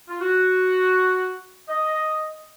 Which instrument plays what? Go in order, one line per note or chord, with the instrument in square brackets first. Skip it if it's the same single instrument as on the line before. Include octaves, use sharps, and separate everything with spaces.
[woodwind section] F4
F#4
D#5